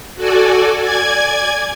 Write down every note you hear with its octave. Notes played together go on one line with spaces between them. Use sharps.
F#4 A4 D5 G#5
D5 G#5 G#6